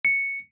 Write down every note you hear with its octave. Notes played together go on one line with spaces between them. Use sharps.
C#7